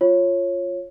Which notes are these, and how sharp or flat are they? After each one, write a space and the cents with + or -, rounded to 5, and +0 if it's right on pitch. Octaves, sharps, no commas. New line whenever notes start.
F4 +0 C#5 -15